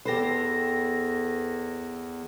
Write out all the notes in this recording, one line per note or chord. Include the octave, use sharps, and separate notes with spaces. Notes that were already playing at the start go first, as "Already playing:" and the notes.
E2 G4 A4 B4 C5 A#6